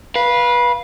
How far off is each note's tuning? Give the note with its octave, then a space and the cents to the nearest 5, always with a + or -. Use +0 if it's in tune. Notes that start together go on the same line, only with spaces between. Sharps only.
B4 -20 F5 +0